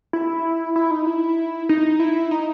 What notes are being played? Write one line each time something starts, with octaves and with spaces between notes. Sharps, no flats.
E4
E4
D#4
E4
D#4
E4
D#4